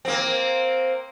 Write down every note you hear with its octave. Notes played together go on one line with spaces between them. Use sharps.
A#3 C4